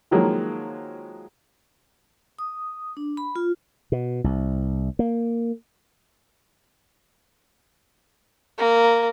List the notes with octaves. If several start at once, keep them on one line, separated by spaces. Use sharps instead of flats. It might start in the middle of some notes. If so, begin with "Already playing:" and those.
D#3 F3 F#3 G#3 A#3
D#6
D4
B5
F4
B2
C2
A#3
A#3